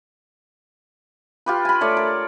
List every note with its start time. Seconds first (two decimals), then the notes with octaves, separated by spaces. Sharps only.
1.46 F4 G4 B4
1.65 G#5 B5
1.81 A3 C#5 D5
1.97 A#4